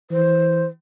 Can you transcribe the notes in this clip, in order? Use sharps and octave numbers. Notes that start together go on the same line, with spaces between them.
E3 C5